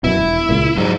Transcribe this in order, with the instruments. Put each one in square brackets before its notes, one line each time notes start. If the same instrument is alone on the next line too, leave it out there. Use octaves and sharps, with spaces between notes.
[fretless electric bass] F#2 B2 [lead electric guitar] E4
[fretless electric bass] E1
C#2 A#2
[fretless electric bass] G#2 [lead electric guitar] F#3 G3